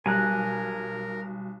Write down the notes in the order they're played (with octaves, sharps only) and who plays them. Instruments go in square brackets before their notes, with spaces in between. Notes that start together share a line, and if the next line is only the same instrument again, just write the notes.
[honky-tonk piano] B1 [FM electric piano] G3 [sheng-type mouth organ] A#4 [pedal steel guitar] G#5 A#5 F#6